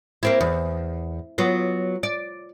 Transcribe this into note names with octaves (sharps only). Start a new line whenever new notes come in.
A#3 C4 E4
E2
F#3 B3 F4
D5